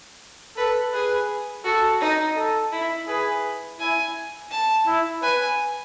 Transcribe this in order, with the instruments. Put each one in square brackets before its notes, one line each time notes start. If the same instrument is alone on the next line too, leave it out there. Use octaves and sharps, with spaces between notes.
[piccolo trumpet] A4 [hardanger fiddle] B4
[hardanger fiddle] G#4 [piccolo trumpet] B4
[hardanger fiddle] F#4 [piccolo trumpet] A4
[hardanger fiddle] D#4
[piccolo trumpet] A4
[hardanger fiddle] E4
[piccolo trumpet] G#4 [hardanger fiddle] B4
[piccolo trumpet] E4 [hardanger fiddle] G#5
[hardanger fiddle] A5
[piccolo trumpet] E4
[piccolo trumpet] B4 [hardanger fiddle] G#5